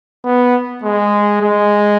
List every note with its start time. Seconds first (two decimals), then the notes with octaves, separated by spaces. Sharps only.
0.25 B3
0.83 G#3
1.42 G#3